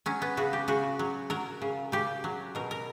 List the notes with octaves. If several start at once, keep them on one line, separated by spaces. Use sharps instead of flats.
F#3 C#4
B3
C#3 F#4
G4
C#3 F#4
F#3
F#3 A#4
C#3
C#3 G4
F#3
B2 A#4
A#4